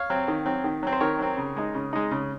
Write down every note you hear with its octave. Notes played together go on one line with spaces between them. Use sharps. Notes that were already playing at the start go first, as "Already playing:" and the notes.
Already playing: C#5 F5
F#3 C4
D#3
F#3 C4
D#3
F#3 C4
C5
D#3 A#4 C#5
F#3 C4
C#3
G#3 D#4
C#3
G#3 D#4
C#3